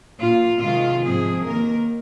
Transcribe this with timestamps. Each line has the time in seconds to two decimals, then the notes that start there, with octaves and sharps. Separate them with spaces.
0.20 A#2 A#3 F4
0.61 C3 D#3 G#3 F4
1.03 G#2 F3 C4 G#4
1.43 D#2 D#3 A#3 A#4